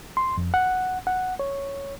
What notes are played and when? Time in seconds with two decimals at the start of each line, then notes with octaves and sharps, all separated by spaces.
0.17 C6
0.37 F2
0.54 F#5
1.07 F#5
1.39 C#5